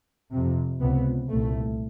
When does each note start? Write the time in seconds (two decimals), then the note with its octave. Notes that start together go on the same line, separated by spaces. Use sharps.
0.31 F2 C3
0.81 C#2 C3 B3
1.30 C2 A#2 A3